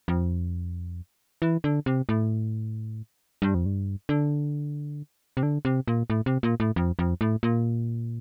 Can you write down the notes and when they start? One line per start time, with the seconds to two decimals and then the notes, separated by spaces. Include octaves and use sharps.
0.08 F2
1.42 E3
1.64 D3
1.86 C3
2.09 A2
3.42 G2
3.54 F2
3.66 G2
4.09 D3
5.37 C3
5.43 D3
5.65 C3
5.88 A#2
6.10 A2
6.26 C3
6.43 A#2
6.60 A2
6.76 F2
6.99 F2
7.21 A2
7.43 A#2